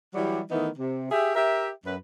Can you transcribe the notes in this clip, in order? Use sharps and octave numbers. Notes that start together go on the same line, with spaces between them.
E3 F#3 G3
D#3 E3 A3 B3 D#4
C3
G4 G#4 E5
G4 A#4 E5
F#2 B4